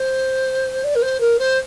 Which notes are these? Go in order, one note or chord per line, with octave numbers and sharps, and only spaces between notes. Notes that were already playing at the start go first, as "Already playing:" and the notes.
Already playing: C5
D5
A#4
C5
A#4
C5